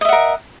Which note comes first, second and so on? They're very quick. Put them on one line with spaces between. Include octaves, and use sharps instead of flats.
D#5 E5 F#5 A#4